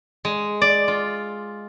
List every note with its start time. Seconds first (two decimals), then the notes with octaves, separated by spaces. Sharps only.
0.25 G#3
0.61 D5
0.88 F4